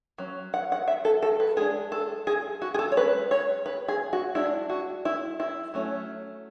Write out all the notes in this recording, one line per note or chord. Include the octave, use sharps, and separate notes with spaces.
F#3 C#4
F#5
F#5
E5
A4
A4
B4
G#3 D4 G#4
A4
G#4
F#4
G#4
A4
C#5
G#3 C#4 B4
C#5
B4
G#4
F#4
G#3 D4 E4
F#4
E4
E4
F#3 A3 C#4